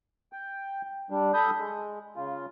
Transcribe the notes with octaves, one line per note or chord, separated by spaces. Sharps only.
G5
G3 D4
A4 B5 D#6 G6
G#3
C#3 F4